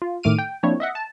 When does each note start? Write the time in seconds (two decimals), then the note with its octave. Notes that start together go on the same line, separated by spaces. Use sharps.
0.02 F4
0.23 A2 D#3 A3 D6 F6 D#7
0.38 G5
0.63 F3 A#3 C4 D4 E4 C#5
0.80 D#5 E5 F#5
0.95 A5